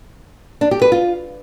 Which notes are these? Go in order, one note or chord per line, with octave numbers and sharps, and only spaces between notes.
D4
G4
B4
F4